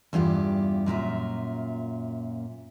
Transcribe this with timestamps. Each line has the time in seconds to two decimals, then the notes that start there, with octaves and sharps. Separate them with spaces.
0.13 E2 G2 F4 G4
0.86 F#2 A#2 F4 E5